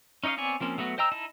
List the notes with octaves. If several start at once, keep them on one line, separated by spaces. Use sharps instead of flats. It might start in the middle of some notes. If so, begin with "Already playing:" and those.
C#4 D#4 C#5 D#5 F5
B3 C4 C#5 D5 G#5
F3 A#3 C4 C#4
F#3 A3 B3 F#4
C5 D#5 G5 A#5 E6
D#4 E4 D#5 A5